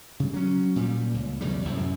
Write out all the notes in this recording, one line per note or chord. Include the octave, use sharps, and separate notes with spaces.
C#3 G3
F#3 C#4
A#2 G3
C#2
B1 E2 C#3 G3
C2 F#2 A2